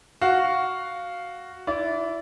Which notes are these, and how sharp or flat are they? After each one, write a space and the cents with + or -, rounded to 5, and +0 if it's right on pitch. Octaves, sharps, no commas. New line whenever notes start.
F#4 +0 F5 +0
E4 +10 D5 -25